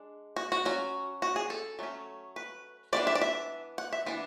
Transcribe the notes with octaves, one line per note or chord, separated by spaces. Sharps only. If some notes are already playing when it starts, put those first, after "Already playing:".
Already playing: G#3 D4
F#4
F#4
F#3 C#4 F#4
F#4
G#4
A4
F#3 A3 C#4
B4
E3 B3 D4 D5
E5
D5
E5
F#5
E5
E3 B3 D4